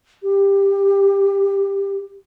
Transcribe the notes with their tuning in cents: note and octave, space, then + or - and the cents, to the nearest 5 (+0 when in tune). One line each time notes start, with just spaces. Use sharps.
G4 +15